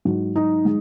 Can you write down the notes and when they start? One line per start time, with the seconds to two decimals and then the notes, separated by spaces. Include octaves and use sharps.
0.05 G#2 F#3 F#4
0.36 D#4
0.65 G#3